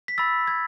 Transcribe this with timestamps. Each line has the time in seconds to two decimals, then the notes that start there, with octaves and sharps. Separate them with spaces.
0.08 B6
0.18 B5 E6 A6
0.47 G#6